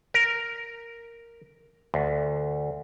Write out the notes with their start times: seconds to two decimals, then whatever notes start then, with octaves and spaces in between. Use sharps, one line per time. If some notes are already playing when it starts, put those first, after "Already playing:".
0.14 A#4
1.94 D2